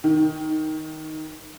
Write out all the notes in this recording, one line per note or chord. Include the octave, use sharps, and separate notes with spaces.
D#3